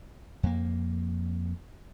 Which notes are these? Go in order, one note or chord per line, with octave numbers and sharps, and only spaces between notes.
F2 A#3